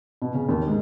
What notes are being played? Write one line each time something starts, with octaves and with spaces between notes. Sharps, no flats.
B2
C#3
D#2
G#2